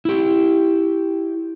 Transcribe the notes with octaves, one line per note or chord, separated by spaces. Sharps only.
E4 G4